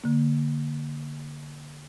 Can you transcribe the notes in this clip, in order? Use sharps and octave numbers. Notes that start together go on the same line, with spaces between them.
D3 A#3